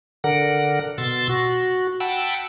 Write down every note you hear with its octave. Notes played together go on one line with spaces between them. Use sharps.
D3 A#4 F#5
B2 C6 E6 A6
F#4
F#5 G5 A5 B5 E6